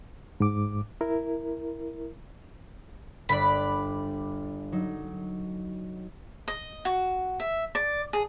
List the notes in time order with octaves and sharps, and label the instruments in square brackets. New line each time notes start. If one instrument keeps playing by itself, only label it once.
[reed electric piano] G#2 D6
E4 A#4
[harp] G1 D4 F#6 [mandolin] D5 B5
[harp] F#3 D#4
[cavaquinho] D#5
F#4
E5
D5
G#4